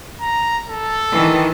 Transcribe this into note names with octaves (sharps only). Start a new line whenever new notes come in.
A#5
A4
D#3 E3